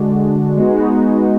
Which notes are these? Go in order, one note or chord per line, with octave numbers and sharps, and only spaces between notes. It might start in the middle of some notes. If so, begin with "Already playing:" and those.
Already playing: D3 G#3 D4 F#4
G#3 B3 D#4 F#4